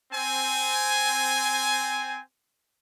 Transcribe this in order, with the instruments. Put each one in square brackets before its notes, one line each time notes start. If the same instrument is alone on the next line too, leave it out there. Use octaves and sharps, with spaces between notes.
[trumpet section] C4 G#5